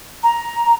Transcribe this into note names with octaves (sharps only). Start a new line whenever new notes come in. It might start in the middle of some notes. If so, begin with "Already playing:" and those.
A#5